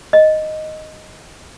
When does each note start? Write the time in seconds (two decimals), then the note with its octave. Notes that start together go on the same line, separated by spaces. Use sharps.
0.13 D#5